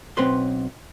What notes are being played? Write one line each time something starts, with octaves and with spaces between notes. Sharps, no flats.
B1 C4 C#4 B4 C6